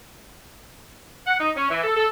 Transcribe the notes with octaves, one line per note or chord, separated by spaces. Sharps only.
F#5
D#4
C#4
E3
A4
A4